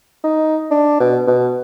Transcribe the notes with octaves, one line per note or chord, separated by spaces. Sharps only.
D#4
D4
B2
B2